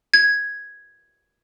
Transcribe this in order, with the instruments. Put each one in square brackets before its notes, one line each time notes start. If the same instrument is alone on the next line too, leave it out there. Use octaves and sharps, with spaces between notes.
[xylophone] G#6